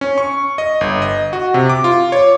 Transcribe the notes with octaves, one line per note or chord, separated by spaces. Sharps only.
C#4
C#6
D#5
G1
D#5
F#4
C3
D6
F4
C#5